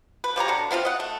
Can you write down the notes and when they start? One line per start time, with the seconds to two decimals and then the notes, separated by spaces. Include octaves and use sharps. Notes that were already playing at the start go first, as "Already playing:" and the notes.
0.24 B4
0.36 F3 G4 C#5 A#5
0.48 B2 D3
0.71 B3 C4 F4 F5
0.85 D#5 F#5
1.00 A3